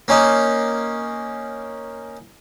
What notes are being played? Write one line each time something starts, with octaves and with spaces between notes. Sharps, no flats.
A#3 C#4 D#4